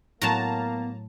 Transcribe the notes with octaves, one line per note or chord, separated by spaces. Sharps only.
A2 F#3 A#3 B3 A5 A#5